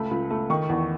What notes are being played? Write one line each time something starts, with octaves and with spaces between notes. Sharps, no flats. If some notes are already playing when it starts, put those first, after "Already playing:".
Already playing: C#2 A3 B5
C#2
A3
D#3 C#6
E2